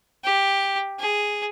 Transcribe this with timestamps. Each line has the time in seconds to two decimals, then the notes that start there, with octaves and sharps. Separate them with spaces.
0.24 G4
0.99 G#4